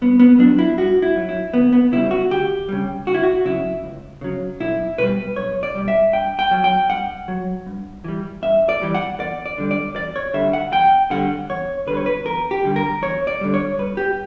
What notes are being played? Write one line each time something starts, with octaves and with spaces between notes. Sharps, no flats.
G2 B3
B3
F#3 D4
E4
G2 F#4
E4
F#3
E4
D2 B3
B3
C#3 G3 E4
F#4
D2 G4
C#3 G3
C#2 F#4
E4
F#4
C#3 F#3 E4
C#2
C#3 F#3
B1 E4
B2 G3 B4
B1 C#5
D5
B2 G3
E5
G2 G5
G5
F#3
G5
G2 F#5
F#3
G2
E3 G3
G2 E5
D5
E3 G3
F#5
E2 D5
D5
D3 G3
D5
E2 D5
C#5
D3 G3 E5
F#5
E2 G5
D3 G3 F#5
E2 C#5
D3 G3 B4
C#5
B4
E2 A#4
G4
D3 G3
A#4
E2 C#5
D5
D3 G3
C#5
G2 B4
G4